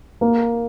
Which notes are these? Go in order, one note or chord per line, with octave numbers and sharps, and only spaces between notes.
A#3